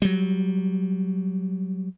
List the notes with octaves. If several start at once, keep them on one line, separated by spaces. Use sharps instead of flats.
F#3 G3